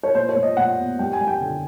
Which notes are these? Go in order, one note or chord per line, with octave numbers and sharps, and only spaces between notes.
C#5
A#2 C5
C#5
A#2
D#5
A#2 F#5
B3
G3 G5
G#5
G3
G5
D3